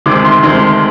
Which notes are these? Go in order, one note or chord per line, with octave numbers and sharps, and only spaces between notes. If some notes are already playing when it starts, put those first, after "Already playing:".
D2 C3 D#3 G#3 D6
C6
D2 C3 D#3 G#3 C6